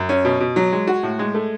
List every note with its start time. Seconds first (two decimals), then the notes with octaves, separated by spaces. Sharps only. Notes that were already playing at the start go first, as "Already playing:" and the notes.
Already playing: F#2
0.09 C#4
0.25 B2
0.40 B2
0.56 F#3
0.72 G#3
0.87 F#4
1.03 A2
1.19 G#3
1.34 A3